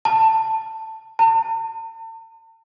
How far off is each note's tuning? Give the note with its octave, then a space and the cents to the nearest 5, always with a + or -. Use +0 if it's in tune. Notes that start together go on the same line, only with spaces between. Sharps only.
A5 +10
A5 +45